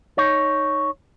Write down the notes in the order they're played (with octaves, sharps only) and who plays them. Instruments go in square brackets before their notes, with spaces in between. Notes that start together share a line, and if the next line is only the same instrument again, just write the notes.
[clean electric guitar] D#4 C#5